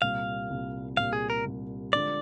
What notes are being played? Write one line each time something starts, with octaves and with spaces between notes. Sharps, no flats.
C2 A#2 G3 F5
C2 A#2 G3
C2 A#2 G3 F5
G#4
A#4
C2 A#2 G3
D3 F3 G#3 D5